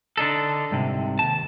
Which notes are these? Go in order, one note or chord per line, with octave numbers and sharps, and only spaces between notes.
D3 D4 D#4 A4
C2 G#2 C3
D#2 A5